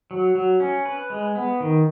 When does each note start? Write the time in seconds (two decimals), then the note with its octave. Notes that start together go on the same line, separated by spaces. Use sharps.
0.11 F#3
0.35 F#3
0.60 C#4
0.85 B4
1.10 G#3
1.35 B3
1.60 D#3